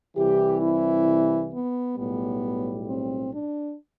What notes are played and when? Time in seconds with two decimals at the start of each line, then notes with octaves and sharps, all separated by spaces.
0.16 C2 C3 E3 G4
0.62 E4
1.53 B3
1.97 B1 A2 G3 B3
2.88 C4
3.33 D4